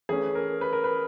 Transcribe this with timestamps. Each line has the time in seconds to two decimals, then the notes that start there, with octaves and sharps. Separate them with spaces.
0.09 E3 A3 C#4 G#4
0.35 A#4
0.61 B4
0.73 A#4
0.84 B4